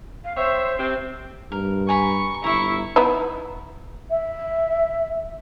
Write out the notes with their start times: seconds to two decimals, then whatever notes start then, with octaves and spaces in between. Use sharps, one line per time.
0.24 F5
0.37 C4 C5 C#5 E5
0.79 C3 C4
1.52 G2 A#4
1.89 G#5 A#5 B5 C#6
2.44 G1 E4 E5 A#5 C#6
2.96 B3 D#4 E4
4.10 E5